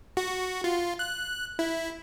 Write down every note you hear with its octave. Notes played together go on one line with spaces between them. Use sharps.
F#4
F4
F#6
E4